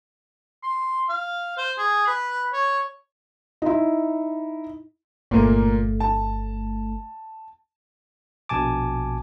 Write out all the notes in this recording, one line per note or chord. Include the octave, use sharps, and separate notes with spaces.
C6
F5
C5
G#4
B4
C#5
D#4 E4
G1 A#2 A3 A#3
A5
A#1 B2 G#5 A5 D6